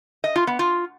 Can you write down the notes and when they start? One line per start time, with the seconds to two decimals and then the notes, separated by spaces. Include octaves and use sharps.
0.24 D#5
0.36 F4
0.47 B3
0.59 F4